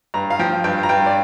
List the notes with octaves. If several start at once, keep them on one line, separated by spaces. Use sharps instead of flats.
G2 A#5
F5
F3 G5
G2 G5
A#5
G2 G5
D5